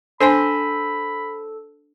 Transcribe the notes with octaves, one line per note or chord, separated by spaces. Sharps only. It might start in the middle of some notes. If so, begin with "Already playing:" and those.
D4 A4 C5 G#5 B5 C6